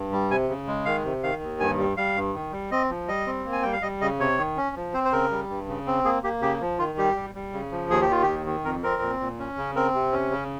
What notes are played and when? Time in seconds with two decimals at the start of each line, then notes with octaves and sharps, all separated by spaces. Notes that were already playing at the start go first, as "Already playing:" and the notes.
Already playing: G2
0.12 G3
0.30 C3 G#5
0.49 C#3
0.67 G#3
0.85 D#3 F5
1.04 C3
1.23 D#3 F5
1.42 D#2
1.60 G2 G#5
1.79 G3
1.97 G3 F5
2.16 G2
2.34 D#3
2.52 G3
2.71 C4 D#5
2.90 F3
3.08 G3 D#5
3.27 C4
3.45 A#3
3.52 G#5
3.62 G3 G5
3.73 F5
3.82 G3 D#5
4.01 C#3 D#5
4.19 C3 C#5
4.38 D#3
4.57 C#4
4.76 F3
4.94 C4 C5
5.05 C5
5.12 C#3 A#4
5.31 G3
5.50 G2
5.68 C#3
5.87 C4
6.05 A#3 G#4
6.23 A#3 G4
6.41 C#3 G4
6.61 F3
6.79 D#3 F4
6.98 G3 G4
7.16 G3
7.35 G3
7.53 C#3
7.71 F3
7.90 D#2 G#4
8.02 G4
8.09 D#3 F4
8.23 D#2 G4
8.46 D#3
8.64 F2 A#4
8.83 C4 A#4
9.02 A#2
9.20 A#2
9.39 C#4
9.58 C#3
9.76 C4 A#4
9.94 C3
10.12 C#4
10.31 C#3